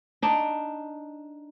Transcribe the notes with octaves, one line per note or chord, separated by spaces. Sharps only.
D4 D#4